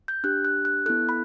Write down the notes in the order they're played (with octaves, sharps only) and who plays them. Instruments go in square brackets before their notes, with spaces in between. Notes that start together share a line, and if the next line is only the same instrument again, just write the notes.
[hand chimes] G6
D4 G4 F#6
F#6
F#6
B3 E4 A4 F#6
B5